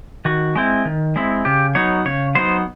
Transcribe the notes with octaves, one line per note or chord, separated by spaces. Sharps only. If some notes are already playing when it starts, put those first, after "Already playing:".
D#3 F#4
G#3 C4 E4
D#3
G#3 C4 E4
C#3 G4
F#3 B3 D#4 C#5
C#3 C#5
F#3 B3 D#4 C5